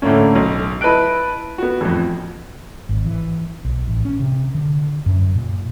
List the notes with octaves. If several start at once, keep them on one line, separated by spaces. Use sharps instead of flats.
A2 D3 A3 A#3 C#4
B1
E4 B4 D#5 A5 F#6 D7
B3 F#4
A1 F2
G#1
E3
B1
A1
C#4
C3
D3
F#2
A#2